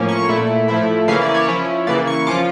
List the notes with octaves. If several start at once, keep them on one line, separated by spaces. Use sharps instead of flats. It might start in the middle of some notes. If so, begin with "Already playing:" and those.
Already playing: A2 F3 A#3 C#4
C#6
A#2 A3 E4
A2 F3 A3 E4
C#3 E3 A#3 C#4 E4 F5
D5
C#5
F3 C#4 E4
C#3 E3 A#3 D5
C#6
F3 C#4 F4 D6